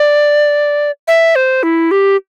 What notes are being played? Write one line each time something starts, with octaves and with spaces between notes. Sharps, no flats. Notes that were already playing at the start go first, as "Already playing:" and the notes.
Already playing: D5
E5
C5
E4
G4